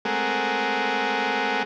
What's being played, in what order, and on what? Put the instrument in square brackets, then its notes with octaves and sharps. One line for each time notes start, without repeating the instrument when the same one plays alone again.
[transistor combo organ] G#3 A3 C4 G#4 A#4 F#5